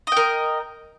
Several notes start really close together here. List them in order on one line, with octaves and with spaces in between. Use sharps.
D#5 G5 A#4